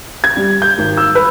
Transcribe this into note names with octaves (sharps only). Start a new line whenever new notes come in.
G#6
G3
G6
G#1
E6
B4